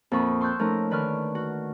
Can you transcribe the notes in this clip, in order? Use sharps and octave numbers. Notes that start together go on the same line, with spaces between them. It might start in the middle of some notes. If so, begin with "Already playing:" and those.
F2 A#2 A#3 B5 C#6 D#6
A5 C6 C#6 E6 F#6 G6
F3 A3 C#4 D#4 A#4
D2 D#3 B4 D5 C#6 F6
F#4